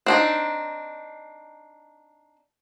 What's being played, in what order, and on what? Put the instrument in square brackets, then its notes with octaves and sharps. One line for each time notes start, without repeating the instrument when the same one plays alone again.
[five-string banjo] C4 D4 D#4